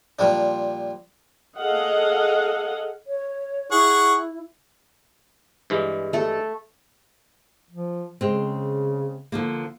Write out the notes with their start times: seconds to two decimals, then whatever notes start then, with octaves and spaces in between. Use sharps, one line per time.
0.19 A#2 F3 G3 D4
1.57 G#4 A4 D#5 F5 F#5
3.07 C#5
3.71 E4 G#4 F#5 C#6
5.70 G2 E3 G#3
6.13 A3 A4
7.71 F3
8.21 C#3 G#3 C4
9.32 D3 F3 A#3